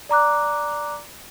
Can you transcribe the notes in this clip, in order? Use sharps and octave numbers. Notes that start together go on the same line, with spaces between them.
D5 A#5 D6 F#6